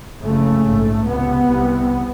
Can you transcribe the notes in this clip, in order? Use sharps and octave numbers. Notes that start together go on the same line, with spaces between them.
F#1 F2 C#3 A3
A#1 G#2
C#2 C3 B3
C2 C3